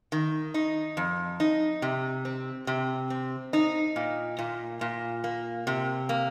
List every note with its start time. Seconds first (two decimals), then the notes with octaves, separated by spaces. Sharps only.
0.12 D#3
0.54 D#4
0.97 F2
1.40 D#4
1.82 C3
2.25 C4
2.67 C3
3.10 C4
3.53 D#4
3.96 A#2
4.39 A#2
4.81 A#2
5.24 A#3
5.67 C3
6.09 A#3